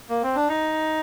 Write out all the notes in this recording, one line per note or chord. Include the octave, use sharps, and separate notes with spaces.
A#3
C4
D4
D#4